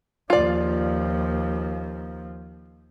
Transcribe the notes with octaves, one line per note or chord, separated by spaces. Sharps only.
D#2 F3 F4 D5